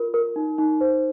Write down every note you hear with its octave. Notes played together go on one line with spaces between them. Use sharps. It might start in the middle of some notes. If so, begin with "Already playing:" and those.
Already playing: F4 A#4
A#4
D#4
D#4
C5